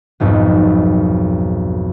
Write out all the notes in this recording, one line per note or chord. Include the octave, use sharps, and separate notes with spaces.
B1 F2 G#2 F#3